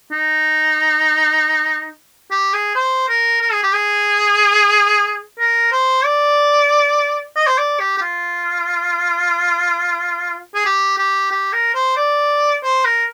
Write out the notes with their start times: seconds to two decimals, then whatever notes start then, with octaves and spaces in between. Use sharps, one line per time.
0.12 D#4
2.31 G4
2.53 G#4
2.75 C5
3.09 A#4
3.41 A#4
3.53 G#4
3.63 G4
3.73 G#4
5.39 A#4
5.72 C5
6.05 D5
7.36 D#5
7.47 C5
7.58 D5
7.80 G4
7.98 G4
8.01 F4
10.54 G#4
10.65 G4
10.98 G4
11.31 G4
11.53 A#4
11.75 C5
11.97 D5
12.63 C5
12.85 A#4